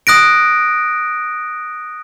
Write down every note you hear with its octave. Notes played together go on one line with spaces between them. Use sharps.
D#6 F#6 A#6 D7